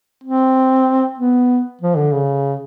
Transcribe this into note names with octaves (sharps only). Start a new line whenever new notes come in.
C4
B3
F3
D3
C#3